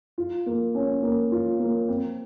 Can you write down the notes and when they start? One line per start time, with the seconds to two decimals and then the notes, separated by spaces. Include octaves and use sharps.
0.18 F4
0.46 A#3
0.75 C#4
1.03 A#3
1.32 F4
1.60 A#3
1.88 C4